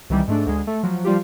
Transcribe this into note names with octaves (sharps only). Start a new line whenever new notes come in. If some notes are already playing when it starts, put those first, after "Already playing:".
C2 D#3 E3 G3
G#2 A3 D4
D2 G#3
A3
F3 F#3
F3 G3 F4 G4